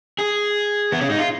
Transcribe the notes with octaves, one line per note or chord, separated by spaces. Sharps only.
G#4
B3
C#4
D#4
F4